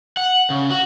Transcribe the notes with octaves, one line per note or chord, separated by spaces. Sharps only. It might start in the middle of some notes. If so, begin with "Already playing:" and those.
F#5
C#3
F#4